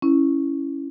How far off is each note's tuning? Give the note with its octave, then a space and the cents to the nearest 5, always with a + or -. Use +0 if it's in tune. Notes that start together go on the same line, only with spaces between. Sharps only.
C#4 +0 E4 +0